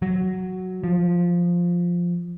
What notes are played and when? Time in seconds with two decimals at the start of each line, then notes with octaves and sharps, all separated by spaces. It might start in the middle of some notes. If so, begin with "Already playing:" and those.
0.02 F#3
0.84 F3